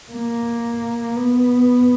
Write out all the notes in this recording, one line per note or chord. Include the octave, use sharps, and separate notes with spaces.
A#3
B3